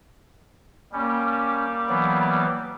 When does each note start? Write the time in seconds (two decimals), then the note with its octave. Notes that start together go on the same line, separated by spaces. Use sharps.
0.93 G3 A#3 C#4
1.89 E3 F#3 B3